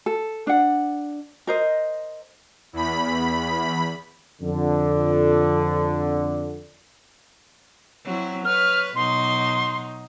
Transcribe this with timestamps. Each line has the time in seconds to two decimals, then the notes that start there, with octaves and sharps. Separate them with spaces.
0.06 A4
0.47 D4 F#5
1.47 A#4 C5 D#5
2.73 E2 B5
4.42 F2 D3
8.05 F#3 C4 E4
8.45 B4 C#5 F6
8.96 B2 F#3 D#4 C6